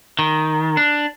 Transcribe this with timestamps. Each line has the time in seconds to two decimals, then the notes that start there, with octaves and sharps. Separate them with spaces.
0.19 D#3
0.77 D4